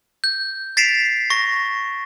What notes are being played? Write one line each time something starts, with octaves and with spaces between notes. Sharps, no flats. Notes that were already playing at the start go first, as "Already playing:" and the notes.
G6
A6 B6 C7 D7 E7 F7
C#6 A#6